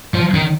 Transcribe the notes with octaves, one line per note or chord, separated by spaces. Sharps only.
F3
D#3